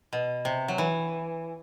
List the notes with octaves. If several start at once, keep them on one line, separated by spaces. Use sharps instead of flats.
B2
C3
F#3
E3